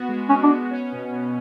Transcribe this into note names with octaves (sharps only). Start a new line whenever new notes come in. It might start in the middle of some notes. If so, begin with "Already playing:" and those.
Already playing: B3 F#4
G#3
G#3 C#4
D4
B3
C#4
B2
B2